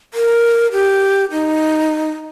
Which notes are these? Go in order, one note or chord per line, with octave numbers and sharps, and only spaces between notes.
A#4
G4
D#4